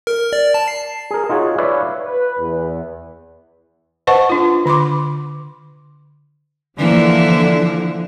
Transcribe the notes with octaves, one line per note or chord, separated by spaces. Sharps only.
A#4
D5
A5
C7
G#4 A#4
D#4 F4 F#4 G#4 C#5
B4 C#5 D5 E5 F5
B4
E2
B4 C5 D#5 F#5 A5 C#6
D4 F4
D3 B5 C6 D6
D3 E3 F3 A#3 E4